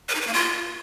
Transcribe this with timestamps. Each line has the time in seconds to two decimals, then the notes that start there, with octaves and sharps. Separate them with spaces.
0.09 B4
0.15 D#4
0.21 B4
0.27 A#3
0.33 F4